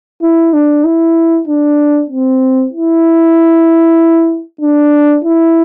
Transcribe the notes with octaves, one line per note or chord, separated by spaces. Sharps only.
E4
D4
E4
D4
C4
E4
D4
E4